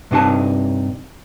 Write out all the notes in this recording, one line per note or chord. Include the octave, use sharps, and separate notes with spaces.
G2 C3 D#4 G#4 A5